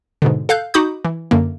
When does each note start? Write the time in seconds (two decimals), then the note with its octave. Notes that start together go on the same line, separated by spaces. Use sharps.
0.22 G#2 B2 D3
0.49 A4 F5 F#6 G6
0.74 D#4 F#4 B5 D6 D#6 G6
1.05 E3
1.31 F#2 D3 A#3